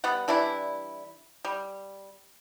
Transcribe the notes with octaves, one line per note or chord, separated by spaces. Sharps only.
G3 B3 F#5
E3 G3 D4 E4
G3